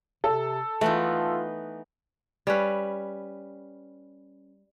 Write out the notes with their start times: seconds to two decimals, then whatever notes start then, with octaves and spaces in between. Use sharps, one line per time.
0.24 C3 A4
0.81 E3 A3 B3 D#4 F4
2.47 G3 C#4 B4